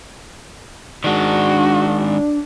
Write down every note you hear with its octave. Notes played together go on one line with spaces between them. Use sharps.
D#3 G#3 D4 F#4